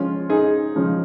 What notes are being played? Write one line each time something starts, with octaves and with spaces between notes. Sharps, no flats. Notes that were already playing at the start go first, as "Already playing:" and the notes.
Already playing: C#3 F3 G#3 C#4 F4
D#4 G#4
C#3 F3 G#3